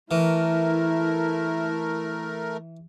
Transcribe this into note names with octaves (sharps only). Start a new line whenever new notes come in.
E3 A3 E4 A#4